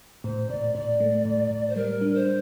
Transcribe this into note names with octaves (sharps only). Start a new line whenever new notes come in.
A2 C5
A2 D5
A2 D5
A3
A2
A2
C5
G3 A#4
D4
C5